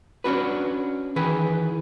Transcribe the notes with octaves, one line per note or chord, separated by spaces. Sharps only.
C#4 D4 F#4 B4
D#3 E3 G#4 B4